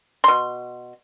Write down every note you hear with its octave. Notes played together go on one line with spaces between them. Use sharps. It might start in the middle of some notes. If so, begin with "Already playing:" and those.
B2 C6